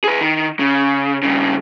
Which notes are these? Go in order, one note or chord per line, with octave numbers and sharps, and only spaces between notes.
G#4 B4
D#3
C#3
G2 C#3